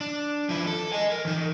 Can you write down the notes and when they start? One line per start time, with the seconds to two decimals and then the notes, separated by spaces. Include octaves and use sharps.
0.01 D4
0.49 F3 E4
0.67 A4
0.93 D#5 G#5
1.11 A#4
1.25 E3 D#4